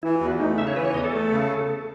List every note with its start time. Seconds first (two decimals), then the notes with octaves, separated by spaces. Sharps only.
0.03 E3 E4
0.21 E2 F#4
0.39 A3 D#4
0.57 C#3 E5
0.67 C#5
0.76 E3 B4
0.85 C#5
0.94 E2 D#5
1.03 A4
1.13 A3
1.31 C#3